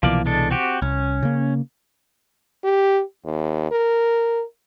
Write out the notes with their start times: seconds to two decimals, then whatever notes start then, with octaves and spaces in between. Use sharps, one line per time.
0.03 C2 B2 E3 F3 A#3 D5
0.26 G#3 D4 A4
0.51 C4 F#4 G4
0.82 C2 C#4
1.23 C#3 A#3
2.64 G4
3.25 D#2
3.71 A#4